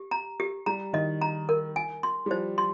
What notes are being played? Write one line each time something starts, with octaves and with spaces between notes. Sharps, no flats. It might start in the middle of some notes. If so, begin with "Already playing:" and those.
Already playing: G4
A#5
G4
G3 A#5
D#3 D#5
A#5
A#4
G#5
C6
G3
F3 C5
C6